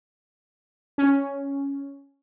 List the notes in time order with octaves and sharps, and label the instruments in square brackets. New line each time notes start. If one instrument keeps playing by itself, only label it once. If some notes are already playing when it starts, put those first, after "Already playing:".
[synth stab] C#4